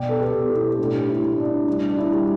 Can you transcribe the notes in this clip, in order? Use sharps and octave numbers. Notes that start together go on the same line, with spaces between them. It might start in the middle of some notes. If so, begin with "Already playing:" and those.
Already playing: B2 D5 G5
A4
G4 B4
B2
E4 A4
A4
A2 D4 G4
E4
A2
D4
G3 D4
D4
E4
G3